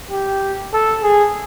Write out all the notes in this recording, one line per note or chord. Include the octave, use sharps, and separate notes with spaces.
G4
A4
G#4